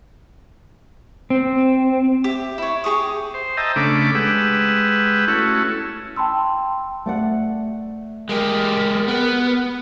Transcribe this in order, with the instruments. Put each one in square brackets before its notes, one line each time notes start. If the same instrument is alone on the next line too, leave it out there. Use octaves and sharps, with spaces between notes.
[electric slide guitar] C4
[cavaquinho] G4 E5
E4 C#5
G4 G#4 C#6 D#6
[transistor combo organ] C5
D#5 E5 G5 A5 A#5
C#3 A3 D4 B5 D6
G#3 G4 B4 F#5 E6
A3 C#4 E4 F#4
[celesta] G5 A5 B5 C6 E6
[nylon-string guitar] A3 D5 F#5
[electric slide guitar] G#3 G4 [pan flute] A#4
[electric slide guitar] B3 [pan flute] A#4